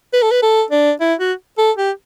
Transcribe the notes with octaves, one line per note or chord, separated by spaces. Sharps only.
B4
A4
B4
A4
D4
E4
F#4
A4
G4